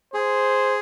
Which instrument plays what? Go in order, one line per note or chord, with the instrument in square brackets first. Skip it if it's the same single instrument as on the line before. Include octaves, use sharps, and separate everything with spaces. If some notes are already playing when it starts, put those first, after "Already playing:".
[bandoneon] G#4 [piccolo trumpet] C5